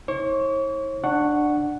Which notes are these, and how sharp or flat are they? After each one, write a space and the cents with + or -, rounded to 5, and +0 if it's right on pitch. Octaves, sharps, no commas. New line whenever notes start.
E4 -45 C#5 -40 C#6 +45
D4 +15 F#5 +0 C#6 +0